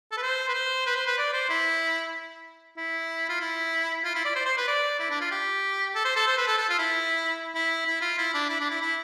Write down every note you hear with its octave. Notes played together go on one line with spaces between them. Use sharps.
A4
B4
C5
B4
C5
B4
C5
B4
D5
C5
E4
E4
F4
E4
F4
E4
D5
C5
C5
B4
D5
E4
D4
F4
G4
A4
C5
A4
C5
B4
A4
A4
F4
E4
E4
E4
F4
E4
D4
E4
D4
E4
E4